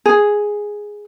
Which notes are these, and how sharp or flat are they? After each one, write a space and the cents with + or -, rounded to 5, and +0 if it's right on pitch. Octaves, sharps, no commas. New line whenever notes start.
G#4 +0